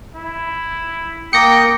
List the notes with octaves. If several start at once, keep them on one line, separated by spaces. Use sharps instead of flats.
E4
A#3 G5 D#6 A#6 C#7